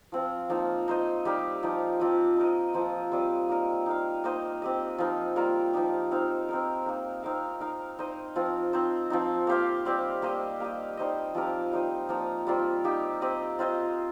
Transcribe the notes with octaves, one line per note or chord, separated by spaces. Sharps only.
F3 C4 F4
F3 A#3 D#4
D#4 C5 D#5
G3 D#4 G4 A#4
F3 D#4 G4
F3 C4 G4 D#5
D#4 A#4 D#5
F3 A#3 F4 C5
G3 C4 G4 D#5
A#3 D#4 A#4 D#5
D#4 A#4 F5
A#3 D#4 C5 D#5
C4 G4 D#5
F3 D#4 A#4
G3 A#3 F4 A#4
F3 D#4 G4
C4 D#4 C5 F5
C4 D#4 A#4
A#3 D#4 A#4
C4 D#4 A#4 F5
D#4 A#4 F5
D#4 C5 D#5
F3 C4 F4
C4 D#4 C5
F3 C4 D#4
A#3 G4 C5 F5
G3 C4 G4
A#3 G4 C5 D#5
A#3 G4 D#5
G3 D#4 C5 D#5
F3 C4 G4 A#4
G3 D#4 C5 D#5
F3 A#3 D#4
G3 C4 F4 A#4
A#3 D#4 G4
C4 G4 D#5
C4 F4 C5 D#5